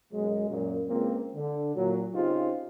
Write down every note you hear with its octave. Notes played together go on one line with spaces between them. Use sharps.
F#2 B2 F#3 G#3
F#2 A#2
C#2 A#3 C4
D3
A#2 F#3
C#3 C4 D#4 F4 G4 C5